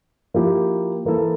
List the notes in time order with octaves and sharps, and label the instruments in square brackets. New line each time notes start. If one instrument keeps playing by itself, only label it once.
[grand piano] F3 A#3 E4 G4
E3 A#3 E4 A4